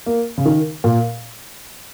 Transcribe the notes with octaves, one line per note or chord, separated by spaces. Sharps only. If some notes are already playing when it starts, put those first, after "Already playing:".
A#3
C#3
D#3
A#2